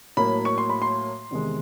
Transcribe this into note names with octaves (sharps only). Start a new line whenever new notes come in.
A2 F#3 A#3 B5
C#6
C6
B5
C6
E2 C3 D#3 G#3